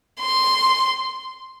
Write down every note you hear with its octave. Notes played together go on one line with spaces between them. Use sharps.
C6